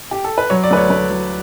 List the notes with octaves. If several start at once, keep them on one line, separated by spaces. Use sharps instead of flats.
G4
A4
B4
F#3 C#5
D5
D2 B4
C#5
D2 B4
F#3